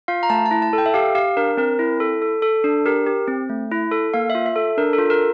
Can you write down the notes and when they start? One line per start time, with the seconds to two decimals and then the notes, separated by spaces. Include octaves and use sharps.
0.08 F4 F5
0.23 A#5
0.30 A3 A5
0.46 A5
0.51 E4
0.62 A5
0.73 A4
0.78 G5
0.86 E5
0.94 G4 F5
1.15 G4 F5
1.37 D4 A#4
1.57 C4 A#4
1.79 E4
2.00 A4
2.22 A4
2.42 A4
2.64 D4
2.86 G4 A#4
3.06 G4
3.28 C4
3.49 A3
3.71 E4
3.92 A4
4.14 A#3 F5
4.30 E5
4.35 F4
4.46 E5
4.56 A4
4.77 D4 A#4
4.93 A4
4.98 F4
5.10 A#4